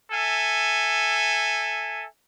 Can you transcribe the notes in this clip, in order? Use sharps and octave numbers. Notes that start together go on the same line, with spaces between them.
A4 E5 G#5